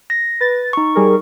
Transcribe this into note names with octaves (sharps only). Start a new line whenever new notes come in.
A#6
B4 A6
D#4 C#6
G3 G#4 A#4